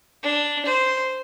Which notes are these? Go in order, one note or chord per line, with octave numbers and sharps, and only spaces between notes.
D4
C5